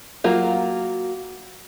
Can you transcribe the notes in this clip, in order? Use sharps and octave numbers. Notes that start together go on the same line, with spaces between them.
F#3 A#3 F4